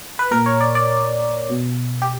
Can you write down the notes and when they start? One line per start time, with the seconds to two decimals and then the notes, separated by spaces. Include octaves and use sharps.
0.19 B4
0.31 A#2 A#4
0.46 C#5
0.61 D5
0.75 D5
1.49 B2
2.02 G4